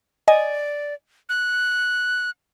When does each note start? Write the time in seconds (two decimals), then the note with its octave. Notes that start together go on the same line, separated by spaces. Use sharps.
0.28 D5 D#5 G#5
1.29 F#6